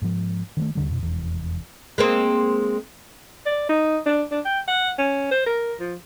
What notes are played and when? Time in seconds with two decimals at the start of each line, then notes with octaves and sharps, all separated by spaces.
0.02 G#2 F3
0.57 D#3 G#3 A3
0.75 D#2 D3 G3
0.88 F2 B2
1.03 F1 E2
1.98 G#3 A#3 C4
3.46 D5
3.69 D#4
4.06 D4
4.31 D4
4.45 G5
4.68 F#5
4.98 C#4
5.31 C5
5.46 A#4
5.80 F3